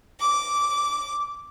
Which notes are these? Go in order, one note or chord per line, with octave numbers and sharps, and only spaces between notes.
D6